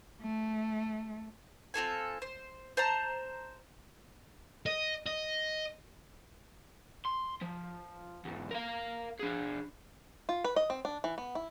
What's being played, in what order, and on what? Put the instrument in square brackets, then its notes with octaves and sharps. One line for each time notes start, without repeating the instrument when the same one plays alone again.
[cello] A3
[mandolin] C4 F4 A4 G#5
C5
C5 A5 A#5
[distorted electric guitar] D#5
D#5
[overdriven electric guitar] C6
F3
E2 G#2
A#4 F5
D4 G#4
[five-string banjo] F4
B4
D#5
C4
D4
E3
B3
E4